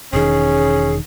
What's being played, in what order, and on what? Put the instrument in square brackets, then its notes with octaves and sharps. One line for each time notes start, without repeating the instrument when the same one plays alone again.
[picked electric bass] E1 D#3 [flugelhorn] C#4 [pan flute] G#4